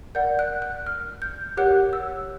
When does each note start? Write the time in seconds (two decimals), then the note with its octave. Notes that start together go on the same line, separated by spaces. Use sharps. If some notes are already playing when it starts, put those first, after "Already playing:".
0.15 A#4 D5 F#5 G6
0.39 F#6
0.62 F#6
0.87 F6
1.22 G6
1.57 G4 A#4 C#5 F#5 F#6
1.93 E6